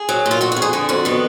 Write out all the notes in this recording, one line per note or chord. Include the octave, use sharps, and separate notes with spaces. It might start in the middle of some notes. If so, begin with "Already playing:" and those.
Already playing: G#4
F#3
A#2
F4
F2 F#4
F#4
F2
G#4
D3 G#4
F2 F#4
D#3 B3